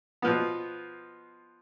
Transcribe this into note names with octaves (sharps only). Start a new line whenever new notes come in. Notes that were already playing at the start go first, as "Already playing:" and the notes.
B2 F3 B3